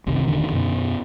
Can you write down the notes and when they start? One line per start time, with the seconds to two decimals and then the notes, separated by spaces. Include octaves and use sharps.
0.06 F#1 C2 C3 D#3
0.28 D#1 E2 D3 D#3
0.52 F#2 B2 B3